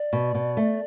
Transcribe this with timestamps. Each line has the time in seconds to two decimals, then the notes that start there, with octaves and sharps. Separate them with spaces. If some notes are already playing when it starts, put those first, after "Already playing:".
Already playing: D5
0.13 B2
0.34 B2
0.57 A3